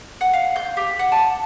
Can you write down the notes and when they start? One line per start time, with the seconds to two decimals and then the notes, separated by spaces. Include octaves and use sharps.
0.21 F#5
0.33 F5
0.56 G6
0.77 G4
0.99 F#5
1.12 A5